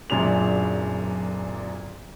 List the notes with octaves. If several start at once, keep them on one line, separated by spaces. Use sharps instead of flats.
D1 F#2 A#2 D4 G#4 F7